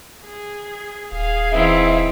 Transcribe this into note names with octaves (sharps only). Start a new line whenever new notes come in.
G#4
D#1 G#4 F5
E3 C4 D#4 E5